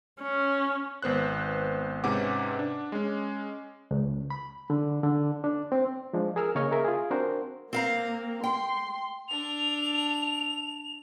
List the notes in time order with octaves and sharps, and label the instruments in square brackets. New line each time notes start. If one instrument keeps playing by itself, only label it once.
[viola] C#4
[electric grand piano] G#1 B3 C5 F#6
G#2 C3 C#4 B4 F#5 D6
D4
G#3 C#4
[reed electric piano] C#2
B5
D3
D3
D4
C4
F3 G#3 D4
G#4 A#4 E6 F6
C#3 A#3 C#5 D#5 C#6 F6
G#4 A#4 E5
F4 G#4
C4 D4 F#4 A#4 C5
[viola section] A#3 [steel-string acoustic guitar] C4 F5 A#5
[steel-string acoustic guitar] G5 [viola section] C6
[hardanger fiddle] D4 A4 [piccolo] F7